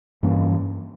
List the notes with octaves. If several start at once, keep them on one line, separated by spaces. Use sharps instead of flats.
G2 E3 A#3 C#4